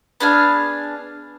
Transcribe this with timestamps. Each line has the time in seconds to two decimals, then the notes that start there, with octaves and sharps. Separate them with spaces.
0.20 B3 D4 G#4 F5